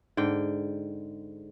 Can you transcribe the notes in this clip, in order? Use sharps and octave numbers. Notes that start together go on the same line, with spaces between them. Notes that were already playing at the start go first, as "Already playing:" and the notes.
G#2 D3 G5